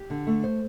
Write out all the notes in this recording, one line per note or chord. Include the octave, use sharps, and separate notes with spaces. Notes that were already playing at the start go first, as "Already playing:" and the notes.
Already playing: G4
D3
A3
C5